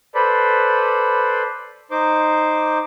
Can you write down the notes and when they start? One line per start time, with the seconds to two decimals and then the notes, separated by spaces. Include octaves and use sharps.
0.15 A4 B4 C5 D5 B5
1.91 D#4 C5 D6